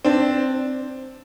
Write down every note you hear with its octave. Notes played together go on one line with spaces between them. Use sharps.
C4 D4